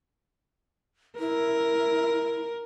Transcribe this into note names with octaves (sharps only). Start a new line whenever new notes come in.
E4 A#4